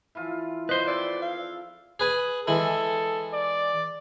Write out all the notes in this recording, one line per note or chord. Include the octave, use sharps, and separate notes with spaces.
E3 F3 F4
B4 C5 D#5
C4 G#4 A4 D5
F5
G#4 B4 G#5
E3 G#3 E4 A4
D5